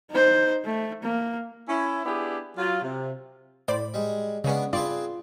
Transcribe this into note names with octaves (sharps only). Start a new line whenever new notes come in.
D#4 C5
A3
A#3
C#4 E4
B3 D4 E4 G4 G#4
F#3 F4
C3
A2 C5 D5 B5
G3 G#3
C#3 G#3 B3 C#4 D4
C4 F4 G#4 B4 D5